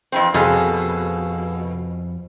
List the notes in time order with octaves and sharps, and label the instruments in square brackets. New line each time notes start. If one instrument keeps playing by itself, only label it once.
[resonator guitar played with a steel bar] F2 E3 C4
[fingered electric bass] F2 [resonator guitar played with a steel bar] B2 [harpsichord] G#4 A4 F5